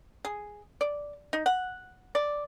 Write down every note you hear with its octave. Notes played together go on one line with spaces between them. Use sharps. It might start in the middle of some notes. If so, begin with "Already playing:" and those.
G#4
D5
D#4
F#5
D5